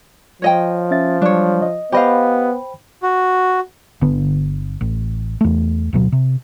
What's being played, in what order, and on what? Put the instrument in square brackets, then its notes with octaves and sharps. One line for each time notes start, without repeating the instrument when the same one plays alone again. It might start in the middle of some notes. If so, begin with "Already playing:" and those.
[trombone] F3 [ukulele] C#5 D#5 G5
[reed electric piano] C#4 E5 A6
[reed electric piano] F#3 G3 D5 [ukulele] D4 C#5
[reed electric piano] D#5
[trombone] B3 [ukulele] G4 D#5 F5 [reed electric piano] C5 G5 B5
[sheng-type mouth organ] F#4
[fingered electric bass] G1 D3 B3
A1
E2 A3
D1 B2 F#3
C3